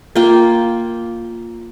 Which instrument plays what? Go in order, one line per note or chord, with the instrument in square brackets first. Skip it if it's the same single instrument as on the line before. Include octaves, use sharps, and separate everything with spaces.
[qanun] A#3 F4 G5